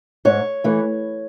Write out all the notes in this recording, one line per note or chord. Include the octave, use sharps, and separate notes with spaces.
G#2 C#5
E3 A3